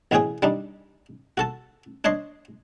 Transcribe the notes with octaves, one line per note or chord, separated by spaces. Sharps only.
A1 B2 C#4 G#4 G5 D#6
G3 D4 D#4
F#4 A4 A5
D4 C#5 D#5 C6